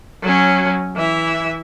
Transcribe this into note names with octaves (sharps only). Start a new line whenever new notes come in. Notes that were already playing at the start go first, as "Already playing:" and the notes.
F#3 C#4
E3 E5